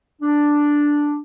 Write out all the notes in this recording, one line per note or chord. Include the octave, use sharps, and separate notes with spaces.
D4